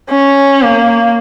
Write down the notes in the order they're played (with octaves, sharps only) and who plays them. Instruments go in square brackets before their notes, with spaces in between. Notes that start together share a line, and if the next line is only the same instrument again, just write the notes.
[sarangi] C#4
A#3